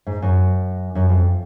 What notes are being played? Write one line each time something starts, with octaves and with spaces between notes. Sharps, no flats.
G#2
F#2
F#2
F2